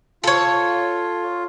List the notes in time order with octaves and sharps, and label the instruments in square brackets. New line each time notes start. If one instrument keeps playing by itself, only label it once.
[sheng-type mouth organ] F4 [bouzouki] A4 C#5